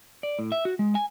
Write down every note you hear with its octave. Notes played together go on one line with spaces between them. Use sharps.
D5
A2
E5
F#4
G#3
G#5